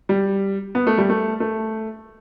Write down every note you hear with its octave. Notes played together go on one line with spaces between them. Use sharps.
G3
B3
A3
G3
A3
A3